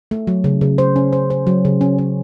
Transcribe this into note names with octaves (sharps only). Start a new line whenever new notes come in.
A3
F#3
C#3
C#3
C5
C#4
C5
C5
F#3
C#3
C#4
C#4